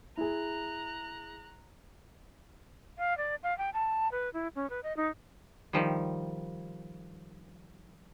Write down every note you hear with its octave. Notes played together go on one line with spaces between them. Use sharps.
E4 G#4 A#5 F#6
F5
D5
F5
G5
A5
B4
E4
C#4
B4
D#5
D#4
D#3 F3 G3